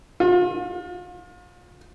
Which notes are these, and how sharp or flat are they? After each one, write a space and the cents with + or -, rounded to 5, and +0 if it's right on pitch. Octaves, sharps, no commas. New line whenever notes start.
F4 +40